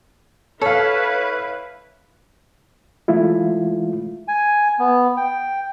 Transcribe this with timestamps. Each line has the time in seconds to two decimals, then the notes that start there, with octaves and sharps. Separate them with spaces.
0.61 E4 A4 B4 C#5 F5
3.08 E3 G#3 A3 E4 F4
4.28 G#5
4.79 B3
5.17 G5